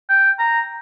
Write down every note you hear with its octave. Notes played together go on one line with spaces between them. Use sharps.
G5
A#5